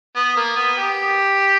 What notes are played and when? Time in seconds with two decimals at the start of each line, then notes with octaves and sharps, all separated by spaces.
0.16 B3
0.37 A#3
0.56 B3
0.77 G4